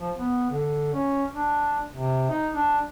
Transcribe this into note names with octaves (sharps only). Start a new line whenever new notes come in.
F3
B3
D3
C#4
D4
C3
D#4
D4